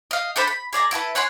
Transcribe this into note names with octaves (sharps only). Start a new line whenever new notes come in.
D#5 F5
D4 A4 C5 B5
B5
G#4 D5 E5 A#5
E4 F#4 A4 B4
C#5 F#5 G#5 C6